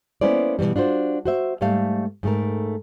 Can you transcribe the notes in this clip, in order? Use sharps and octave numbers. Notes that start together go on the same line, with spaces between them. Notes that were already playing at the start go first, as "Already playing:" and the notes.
A#3 B3 C#4 E4 C5 D5
B2 D#3 E3 G3
D4 F4 F#4 C5
F#4 C5 E5
G#2 G3 A3 F5
G#2 A3 A#4